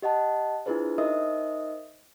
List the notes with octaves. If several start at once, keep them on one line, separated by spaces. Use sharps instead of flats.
G4 D#5 F#5 A5
D4 E4 F4 G#4 B4 C5
D#4 A#4 C5 D#5 E5 D#6